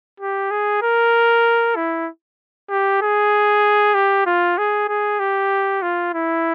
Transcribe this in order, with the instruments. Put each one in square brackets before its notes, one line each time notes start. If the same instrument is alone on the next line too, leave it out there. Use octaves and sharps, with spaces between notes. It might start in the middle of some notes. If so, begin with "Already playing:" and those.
[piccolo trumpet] G4
G#4
A#4
E4
G4
G#4
G4
F4
G#4
G#4
G4
F4
E4